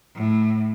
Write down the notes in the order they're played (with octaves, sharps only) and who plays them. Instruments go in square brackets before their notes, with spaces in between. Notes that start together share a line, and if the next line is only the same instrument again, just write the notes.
[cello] A2